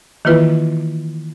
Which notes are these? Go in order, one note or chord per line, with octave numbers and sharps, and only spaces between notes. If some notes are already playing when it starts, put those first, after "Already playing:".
D#3 E3 A#3 E4 F4 B4